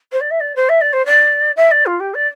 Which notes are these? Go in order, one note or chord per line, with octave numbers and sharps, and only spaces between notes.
C5
D5
E5
D5
C5
E5
D5
C5
D5
E5
D5
F4
G4
D5